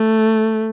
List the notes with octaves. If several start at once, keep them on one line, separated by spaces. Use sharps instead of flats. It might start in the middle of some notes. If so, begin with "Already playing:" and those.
Already playing: A3